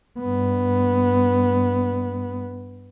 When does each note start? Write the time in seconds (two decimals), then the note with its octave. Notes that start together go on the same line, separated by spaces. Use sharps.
0.19 G2 B3